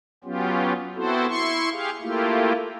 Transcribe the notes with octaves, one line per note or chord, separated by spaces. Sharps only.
F#3 B3 C#4 F4 G4
B3 C4 E4 F#4 A4 C5
E4 C6 C#6
G4 G#4 F5
A3 A#3 E4 F4 G4